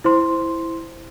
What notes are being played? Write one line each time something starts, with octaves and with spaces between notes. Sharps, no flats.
E4 C5 C6